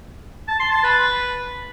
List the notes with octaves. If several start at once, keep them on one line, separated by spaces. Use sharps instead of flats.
A5
C6
A5
B4